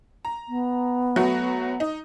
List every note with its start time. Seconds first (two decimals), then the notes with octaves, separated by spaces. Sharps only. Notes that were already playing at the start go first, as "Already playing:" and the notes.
0.25 A#5
0.49 B3
1.16 F#3 A3 F#4
1.80 D#4